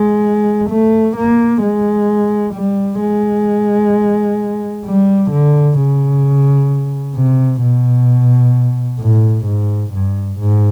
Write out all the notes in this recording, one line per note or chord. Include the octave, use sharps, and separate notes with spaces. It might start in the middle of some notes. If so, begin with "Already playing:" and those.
Already playing: G#3
A3
A#3
G#3
G3
G#3
G3
D3
C#3
C3
B2
A2
G#2
G2
G#2